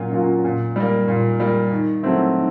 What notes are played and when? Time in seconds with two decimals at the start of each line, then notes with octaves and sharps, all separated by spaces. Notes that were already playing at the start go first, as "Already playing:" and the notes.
Already playing: A#2 F#3 A#3 C#4 F4
0.12 F#3 A#3 C#4 F4
0.44 A#2
0.76 G3 A#3
1.08 A#2
1.40 G3 A#3
1.71 D#3
2.03 F#3 A3 C4 E4
2.35 D#3